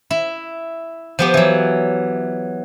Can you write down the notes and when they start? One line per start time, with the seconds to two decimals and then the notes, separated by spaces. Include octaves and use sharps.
0.11 E4
1.19 F3 B3 G4
1.34 E3 F#3